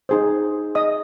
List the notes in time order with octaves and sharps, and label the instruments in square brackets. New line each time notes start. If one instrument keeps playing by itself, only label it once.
[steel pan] D#4 G#4 C5
D#5 D#6